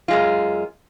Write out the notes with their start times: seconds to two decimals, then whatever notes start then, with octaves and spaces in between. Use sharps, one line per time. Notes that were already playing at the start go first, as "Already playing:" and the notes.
0.08 F#2 G#3 F4